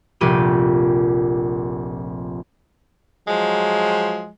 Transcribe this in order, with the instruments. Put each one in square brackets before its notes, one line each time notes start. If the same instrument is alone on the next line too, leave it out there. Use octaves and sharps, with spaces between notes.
[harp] F1 A#1 G4 D#7
[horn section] F3 F#3 G#3